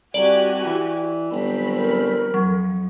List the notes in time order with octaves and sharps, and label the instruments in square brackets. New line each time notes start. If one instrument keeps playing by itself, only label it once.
[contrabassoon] C2 [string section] F#4 G4 G#5 [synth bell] D5 F#7
[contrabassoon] E3
[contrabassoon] G1 [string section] F#3 C4 B5
[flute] A#4
[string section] F2 [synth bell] F#3